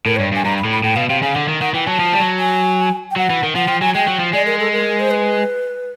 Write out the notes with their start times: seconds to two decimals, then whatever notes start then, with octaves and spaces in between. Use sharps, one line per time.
0.06 A2 A#4
0.16 C#5
0.19 G2
0.32 G2 G#5
0.45 G2 A#5
0.58 B5
0.64 A2
0.71 B5
0.84 A2 G5
0.96 B2 F5
1.09 C3 F5
1.22 C#3 F5
1.35 D3 F#5
1.48 D#3
1.61 D#3 F#5
1.74 E3 G5
1.87 F#3 A5
2.00 F3
2.13 G3
2.20 F#3
2.39 G#5
3.11 G5
3.16 F#3 F#5
3.30 E3
3.43 D#3
3.55 F3 F#5
3.68 F3 G5
3.81 F#3 G#5
3.95 G#3 G5
4.08 F#3
4.20 F3
4.33 G#3 D5
4.46 A#4
4.59 A4
4.72 A#4
5.00 C5
5.11 B4